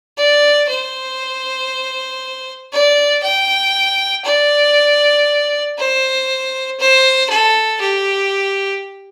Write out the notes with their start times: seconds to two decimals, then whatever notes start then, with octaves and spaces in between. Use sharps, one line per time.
0.18 D5
0.69 C5
2.73 D5
3.23 G5
4.25 D5
5.78 C5
6.79 C5
7.30 A4
7.81 G4